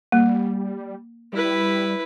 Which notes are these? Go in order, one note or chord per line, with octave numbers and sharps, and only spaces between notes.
G3 A#3
G3 E4 B4